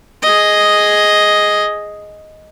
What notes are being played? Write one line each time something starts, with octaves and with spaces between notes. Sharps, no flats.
G#4 D#5